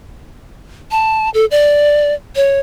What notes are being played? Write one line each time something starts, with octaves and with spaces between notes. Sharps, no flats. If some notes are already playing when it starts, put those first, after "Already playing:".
A5
A4
D5
C#5